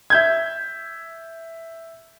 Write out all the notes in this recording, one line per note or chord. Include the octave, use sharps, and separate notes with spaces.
E5 G6 G#6